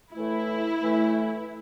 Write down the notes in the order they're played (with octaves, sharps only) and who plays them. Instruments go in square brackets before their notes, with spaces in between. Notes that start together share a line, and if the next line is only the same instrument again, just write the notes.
[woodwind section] A2 E3 A3 [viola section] E4
[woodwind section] A2 E3 A3